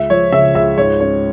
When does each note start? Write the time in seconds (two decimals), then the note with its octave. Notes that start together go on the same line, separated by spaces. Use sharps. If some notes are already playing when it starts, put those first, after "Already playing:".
Already playing: C#2 E5
0.10 F3 C#5
0.32 C#3 E5
0.55 C#2 E5
0.77 G#2 C#5
1.00 C#4 C#5